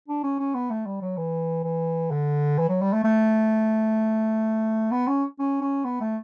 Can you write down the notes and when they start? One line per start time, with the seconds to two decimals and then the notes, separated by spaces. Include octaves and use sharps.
0.08 D4
0.23 C#4
0.39 C#4
0.55 B3
0.70 A3
0.86 G3
1.02 F#3
1.17 E3
1.64 E3
2.11 D3
2.58 E3
2.69 F#3
2.81 G3
2.93 A3
3.04 A3
4.92 B3
5.08 C#4
5.39 C#4
5.61 C#4
5.85 B3
6.01 A3